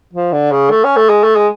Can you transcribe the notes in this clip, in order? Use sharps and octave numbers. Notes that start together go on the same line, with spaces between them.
F3
D3
C#3
A3
C#4
A3
G#3
A3
G#3